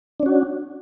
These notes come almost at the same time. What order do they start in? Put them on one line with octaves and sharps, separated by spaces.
D4 C#4 F#4